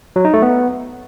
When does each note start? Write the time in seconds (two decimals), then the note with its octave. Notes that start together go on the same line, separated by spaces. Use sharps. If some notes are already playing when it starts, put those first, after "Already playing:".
0.16 F#3
0.25 D#4
0.33 A3
0.42 B3